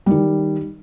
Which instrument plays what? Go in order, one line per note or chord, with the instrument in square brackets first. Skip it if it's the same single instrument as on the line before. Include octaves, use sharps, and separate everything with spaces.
[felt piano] D#3 G3